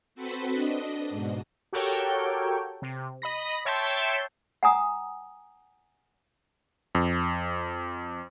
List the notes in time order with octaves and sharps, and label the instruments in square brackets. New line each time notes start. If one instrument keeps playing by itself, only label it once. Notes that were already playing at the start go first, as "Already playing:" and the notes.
[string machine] C4 F#4 A4 B4 C5 B6
D4 D#5
G#2 B2
[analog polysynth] F#4 G4 A4 A#4 C#5 G5
C3
D#5 B5 A#6
C#5 E5 G5 A5 C6 G6
[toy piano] F#5 G#5 A#5 D#6
[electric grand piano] F2